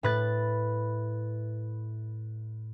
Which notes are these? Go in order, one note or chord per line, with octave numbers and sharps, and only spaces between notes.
A2 B4 A6